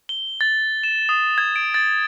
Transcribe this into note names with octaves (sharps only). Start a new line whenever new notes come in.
G7
A6
E7
D#6
G#6
D7
A6